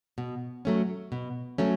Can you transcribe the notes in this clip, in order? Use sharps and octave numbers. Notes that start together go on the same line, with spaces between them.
B2
F#3 A3 C#4
B2
F#3 A3 C#4